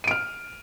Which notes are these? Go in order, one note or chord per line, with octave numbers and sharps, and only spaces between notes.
F6 D7 D#7